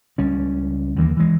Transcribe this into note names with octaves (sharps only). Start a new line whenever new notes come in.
C#2 G3 C#4
D#2 E3 A#3
E3 G#3